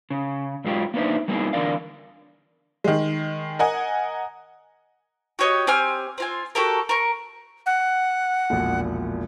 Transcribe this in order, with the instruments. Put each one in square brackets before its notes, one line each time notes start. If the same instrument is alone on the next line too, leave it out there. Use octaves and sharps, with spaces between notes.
[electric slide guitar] C#3
G#2 F#3 G#3 F4 G4
A#3 B3 D4 D#4 C5 E5
G3 A#3 B3 D#4 E4 G#4
E2 D3 A#4 D5 F5
[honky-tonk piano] D#3 G#3
A#4 D#5 F#5 G#5
[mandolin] F#4 G4 C#5 D#5
C4 G4 G#5 F6
C4 F4 G#5
F#4 G4 A4 A#4
A#4 C#6
[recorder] F#5
[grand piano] E1 A#1